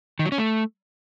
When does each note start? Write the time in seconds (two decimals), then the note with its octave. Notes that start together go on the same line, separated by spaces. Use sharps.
0.19 D#3
0.26 F#3
0.32 C#4
0.38 A3